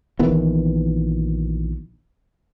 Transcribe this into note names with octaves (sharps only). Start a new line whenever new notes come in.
A#1 D#3 E3 B3